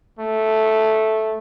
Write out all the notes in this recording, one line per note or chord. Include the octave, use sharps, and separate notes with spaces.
A3